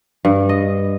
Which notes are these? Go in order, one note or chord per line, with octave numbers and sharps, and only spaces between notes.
G2
D#5